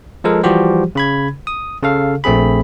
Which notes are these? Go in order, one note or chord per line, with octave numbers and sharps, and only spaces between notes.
F3 G#3 A4 A#4
E3 F3 G3 F#4 G4 C5
C#3 B5 G#6
D#6
C#3 A4 F5
A#1 A3 C4 G#4 B5